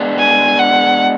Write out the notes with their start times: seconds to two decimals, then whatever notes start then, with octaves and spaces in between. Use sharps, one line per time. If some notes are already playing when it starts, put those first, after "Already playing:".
Already playing: G#3 B3 D4
0.18 G#5
0.59 F#5